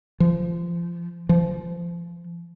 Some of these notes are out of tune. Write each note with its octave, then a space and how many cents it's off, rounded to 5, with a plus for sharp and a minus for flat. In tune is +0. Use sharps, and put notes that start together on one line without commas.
F3 -25
F3 -30